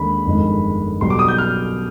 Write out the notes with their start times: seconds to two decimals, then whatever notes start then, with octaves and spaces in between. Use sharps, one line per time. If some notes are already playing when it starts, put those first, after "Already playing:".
Already playing: D#2 D3 G#3 B5
0.26 G1 F2 D#3 G#3
1.01 B1 B2 G3 C6
1.10 D6
1.19 D#6
1.28 G6
1.38 F6